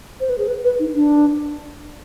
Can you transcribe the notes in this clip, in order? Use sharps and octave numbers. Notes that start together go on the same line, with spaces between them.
C5
B4
G#4
B4
B4
D#4
D4